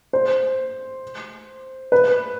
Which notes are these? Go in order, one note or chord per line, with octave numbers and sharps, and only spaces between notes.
C5
B4